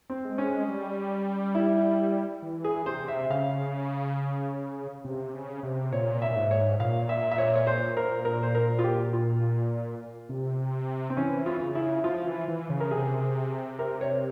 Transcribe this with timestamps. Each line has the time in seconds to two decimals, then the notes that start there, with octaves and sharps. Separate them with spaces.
0.10 C4
0.25 G#3
0.38 C#4
0.68 G3
1.55 E4
2.42 E3
2.64 G#4
2.86 C3 C5
3.08 E5
3.30 C#3 F5
5.05 C3
5.33 C#3
5.63 C3
5.92 A#2 C#5
6.22 E5
6.31 A#2
6.36 G#2
6.51 C#5
6.80 A#2 F5
7.09 E5
7.31 E5
7.38 C#5
7.55 C#5
7.67 C5
7.97 A#4
8.25 A#4
8.43 C5
8.55 A#4
8.79 F4
8.84 G4
9.13 F4
10.29 C3
11.10 C4
11.17 E3 C#4
11.46 F4
11.61 C#3
11.75 E4
12.04 F3 F4
12.26 E3
12.48 E3
12.70 C#3
12.80 A#4
12.91 C3 G#4
13.79 A#4
14.01 C#5